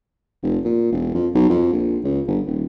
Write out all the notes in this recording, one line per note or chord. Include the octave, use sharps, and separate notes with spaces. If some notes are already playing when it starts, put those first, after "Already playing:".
F1
A#2
E1
F2
B1
F2
A#1
C#2
G1
D#1